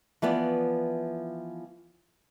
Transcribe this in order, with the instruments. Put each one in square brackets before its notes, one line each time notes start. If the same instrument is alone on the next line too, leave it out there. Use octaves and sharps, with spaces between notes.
[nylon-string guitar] E3 F3 B3 D5